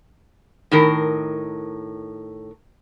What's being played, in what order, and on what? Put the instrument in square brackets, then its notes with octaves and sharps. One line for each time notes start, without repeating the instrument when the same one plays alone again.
[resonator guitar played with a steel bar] A2 D#3 A#4